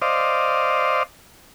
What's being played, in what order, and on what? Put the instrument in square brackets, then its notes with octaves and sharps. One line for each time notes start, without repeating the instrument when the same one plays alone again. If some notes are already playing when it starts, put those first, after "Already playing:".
[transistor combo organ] C5 D5 D#5 F5